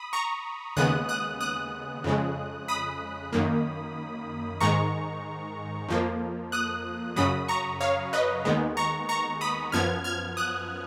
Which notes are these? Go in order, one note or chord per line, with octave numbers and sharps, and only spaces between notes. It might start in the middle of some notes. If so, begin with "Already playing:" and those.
Already playing: B5 D#6
A#5 C#6
D#2 C#3 G#3 B3 D#6 F#6
D#6 F#6
D#6 F#6
F2 C#3 G#3
B5 D#6
F#2 D#3 A#3
G#2 D#3 G#3 A#5 C#6
F2 F3 A#3
D#6 F#6
F#2 C#3 F#3 B5 D#6
A#5 C#6
C#5 F5
B4 D#5
D#2 D#3 G#3 B3
A#5 C#6
A#5 C#6
B5 D#6
F#2 F3 B3 F6 G#6
F6 G#6
D#6 F#6